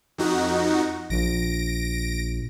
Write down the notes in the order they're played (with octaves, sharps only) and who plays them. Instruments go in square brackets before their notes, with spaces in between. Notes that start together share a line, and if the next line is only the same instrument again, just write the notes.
[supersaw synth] F2 D#4 F#4
[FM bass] A#1 [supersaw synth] A#6 D7